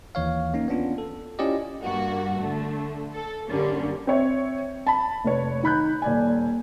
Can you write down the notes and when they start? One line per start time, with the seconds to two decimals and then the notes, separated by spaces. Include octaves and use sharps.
0.15 D#2 E3 C#5 F5
0.54 A#3 C#4 D#4
0.68 B3 C#4 D4 F4
0.98 A4
1.39 C#4 E4 F4 G4 D5 D#5
1.82 G2 A#3 F#4
2.36 D3 A3
3.12 A4
3.49 F#2 D3 G3 A#3 C#4
4.07 C4 C#5 E5
4.87 A5 B5
5.24 F1 B4 C#5
5.63 D#3 B5 F#6 G6
6.02 D#1 D5 G#5